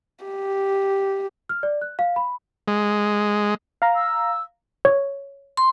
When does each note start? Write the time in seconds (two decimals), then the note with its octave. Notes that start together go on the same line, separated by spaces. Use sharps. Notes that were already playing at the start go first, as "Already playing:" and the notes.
0.25 G4
1.49 F6
1.63 D5
1.81 F#6
1.99 F5
2.16 B5
2.68 G#3
3.82 F5 A#5
3.95 E6
4.85 C#5
5.57 C6